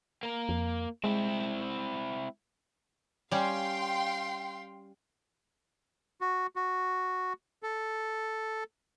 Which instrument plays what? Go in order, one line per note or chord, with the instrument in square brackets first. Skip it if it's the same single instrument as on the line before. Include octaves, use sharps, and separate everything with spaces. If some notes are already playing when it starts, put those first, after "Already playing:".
[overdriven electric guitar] A#3 A#4
[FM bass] F2
[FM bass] G#3 [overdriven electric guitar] C4 E4
[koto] G3 C#4 [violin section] F5 G5 C6
[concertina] F#4
F#4
A4